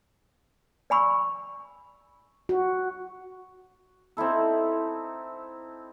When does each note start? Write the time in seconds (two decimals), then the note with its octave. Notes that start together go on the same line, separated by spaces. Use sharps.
0.90 D5 G#5 B5 C#6 E6
2.49 F#4
4.17 C4 D#4 E4 A4